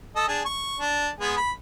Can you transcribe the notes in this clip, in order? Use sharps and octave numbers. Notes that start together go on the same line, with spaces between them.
A4 D#5
D4 G#4
C#6
D4
G#3 B3 G#4
B5